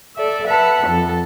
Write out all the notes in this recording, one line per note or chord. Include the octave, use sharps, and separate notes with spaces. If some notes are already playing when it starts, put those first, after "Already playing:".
A4 D5 E5
B4 E5 F#5 A5
F2 A4